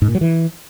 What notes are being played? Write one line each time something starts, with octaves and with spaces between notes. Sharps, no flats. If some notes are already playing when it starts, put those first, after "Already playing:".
G#2
A#2
F#3
E3